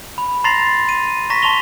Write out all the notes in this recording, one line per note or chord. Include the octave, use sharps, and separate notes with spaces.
B5
A#5 C6 A6 A#6 C7 F7
D#7
A#5 C#6 A#6 B6
A5 C6 C#6 F7 G7